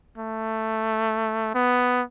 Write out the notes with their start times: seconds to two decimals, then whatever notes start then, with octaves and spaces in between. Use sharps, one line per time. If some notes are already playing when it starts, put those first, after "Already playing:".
0.18 A3
1.55 B3